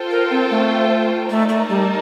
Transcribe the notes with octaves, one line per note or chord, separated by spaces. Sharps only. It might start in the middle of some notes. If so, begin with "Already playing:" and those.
Already playing: F4 A4 C5 G5
A#4
C4
A3
A3 D#4 A#4 D5 A5
A3
G3